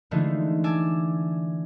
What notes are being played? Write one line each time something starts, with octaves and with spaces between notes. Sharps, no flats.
D3 E3 G#3 A3 D#4 F4
G#5 A5 D6 E6 G#6 A6